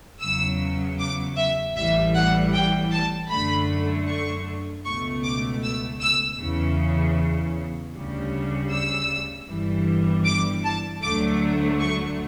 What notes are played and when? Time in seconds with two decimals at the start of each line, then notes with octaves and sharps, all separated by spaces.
0.21 E2 C#3 F#3 E6
0.99 D6
1.37 E5
1.75 A1 A2 E3 G3 E5
2.15 F#5
2.53 G5
2.91 A5
3.30 F#2 D3 A3 B5
4.08 C#6
4.85 C#2 B2 A3 C#6
5.24 D6
5.63 E6
6.01 E6
6.39 E2 C#3 E3
7.94 D2 C#3 G3
8.71 E6
9.48 G1 G2 E3 G3
10.25 D6
10.64 A5
11.03 D2 D3 F#3 A3 D6
11.81 C#6